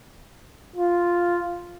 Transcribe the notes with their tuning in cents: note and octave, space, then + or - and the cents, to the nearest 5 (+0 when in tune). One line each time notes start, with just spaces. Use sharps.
F4 +0